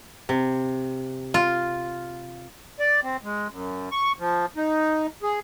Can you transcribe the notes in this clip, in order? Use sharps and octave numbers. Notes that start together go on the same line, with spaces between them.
C3
F4
D5
C4
G#3
F#2
C#6
F3
D#4
G#4